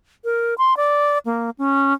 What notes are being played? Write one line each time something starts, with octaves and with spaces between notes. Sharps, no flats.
A#4
C6
D5
A#3
C#4